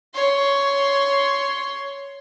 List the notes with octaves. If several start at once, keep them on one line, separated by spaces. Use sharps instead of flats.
C#5 C6